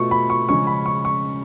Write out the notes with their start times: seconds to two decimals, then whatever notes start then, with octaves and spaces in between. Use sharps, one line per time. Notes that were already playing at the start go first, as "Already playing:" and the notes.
Already playing: B2 A3 F4 C#6
0.11 B5
0.30 C#6
0.49 C#3 F3 G#3 C#4 C#6
0.67 B5
0.86 C#6
1.05 C#6